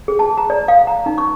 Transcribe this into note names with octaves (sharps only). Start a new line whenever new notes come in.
G#4
A5
A#5
D5
F5
A#5
D#4
C#6